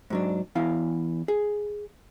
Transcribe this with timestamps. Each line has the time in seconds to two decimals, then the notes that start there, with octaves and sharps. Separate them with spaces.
0.10 G#2 F#3 D4
0.55 E2 E4 F5
1.28 G#4